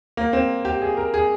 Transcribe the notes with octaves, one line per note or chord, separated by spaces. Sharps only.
A#3
C4
G4
G#4
A#4
G#4